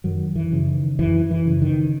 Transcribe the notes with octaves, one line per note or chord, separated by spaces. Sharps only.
F#2 D#3 F#3
E3
C#3
D#3
F#2 E3
E3
C#3
D#3